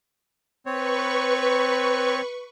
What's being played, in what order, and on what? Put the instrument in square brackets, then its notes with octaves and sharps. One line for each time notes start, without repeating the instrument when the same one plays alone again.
[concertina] C4 C#5 [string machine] B4 C#6